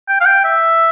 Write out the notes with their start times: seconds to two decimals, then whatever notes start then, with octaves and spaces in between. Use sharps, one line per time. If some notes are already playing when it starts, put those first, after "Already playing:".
0.08 G5
0.20 F5
0.26 G5
0.45 E5